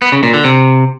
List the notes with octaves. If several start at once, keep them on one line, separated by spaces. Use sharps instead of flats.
B3
C#3
A#2
D3
C3